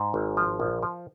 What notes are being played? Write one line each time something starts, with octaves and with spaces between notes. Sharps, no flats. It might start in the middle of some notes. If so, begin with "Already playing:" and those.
Already playing: G#2
G#1
F3
A#1
F3